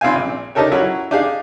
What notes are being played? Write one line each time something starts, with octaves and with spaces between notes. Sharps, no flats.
G#1 C4 F4 E5 F5 G#5
A#1
D4 D#4 G4 A4 A#4 C#5
F#3 C#4 E4
D4 D#4 G4 G#4 F5